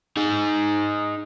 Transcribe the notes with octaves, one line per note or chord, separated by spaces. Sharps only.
D#4 G#4